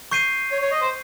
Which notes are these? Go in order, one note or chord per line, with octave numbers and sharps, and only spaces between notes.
C#6 G6 C7 D#7
C#5
C#5
D#5
C5